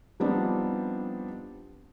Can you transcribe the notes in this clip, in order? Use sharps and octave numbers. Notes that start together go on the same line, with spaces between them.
F3 G3 B3 C4 D4 D#4